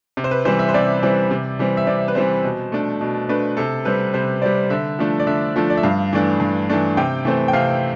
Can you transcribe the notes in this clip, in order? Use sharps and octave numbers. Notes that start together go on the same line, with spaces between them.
C3
C5
B4
E3 G3 C4 C5
E5
C5
C3 D5
E3 G3 C4
C3
E3 G3 C4
E5
C3 D5
B4
E3 G3 C4 C5
B2
A3 D4
B2
A3 D4 B4
C3 A4
G3 C4 B4
C3 C5
G3 C4 D5
D3 E5
F3 A3 D4
D5
D3 E5
F3 A3 D4
D5
E5
G2 F5
E3 A3 D4
G2
E3 A3 D4
C3 G5
E3 A3 C4
G5
C3 F5